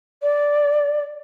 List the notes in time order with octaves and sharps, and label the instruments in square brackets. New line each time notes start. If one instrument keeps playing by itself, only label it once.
[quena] D5